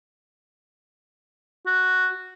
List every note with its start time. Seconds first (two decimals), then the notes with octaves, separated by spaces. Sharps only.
1.67 F#4